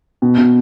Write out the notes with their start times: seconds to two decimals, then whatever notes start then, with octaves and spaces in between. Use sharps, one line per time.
0.22 B2
0.38 B2